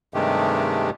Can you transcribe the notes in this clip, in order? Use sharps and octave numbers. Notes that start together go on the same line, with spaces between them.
G2 C3 D#3 G#3 A3 G4